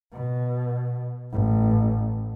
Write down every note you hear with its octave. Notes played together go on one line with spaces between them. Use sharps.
B2
A1